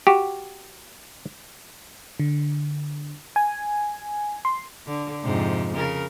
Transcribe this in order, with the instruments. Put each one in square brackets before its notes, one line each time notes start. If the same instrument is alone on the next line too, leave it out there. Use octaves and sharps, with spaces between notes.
[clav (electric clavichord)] F#4 G4
[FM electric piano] D3
G#5
C6
[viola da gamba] D3
F2 G#2 C3
C#3 A#4